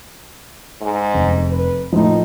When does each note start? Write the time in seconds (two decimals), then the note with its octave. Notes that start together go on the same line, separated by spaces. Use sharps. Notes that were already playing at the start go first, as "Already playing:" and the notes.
0.81 G#2
1.14 F1
1.50 B4
1.92 A2 F3 D#4